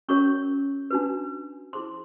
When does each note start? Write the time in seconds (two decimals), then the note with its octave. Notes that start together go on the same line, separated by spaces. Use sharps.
0.09 C#4 F#4 A#4 C#5 C#6
0.90 D4 F#4 B4
1.73 E4 G#4 C5 C6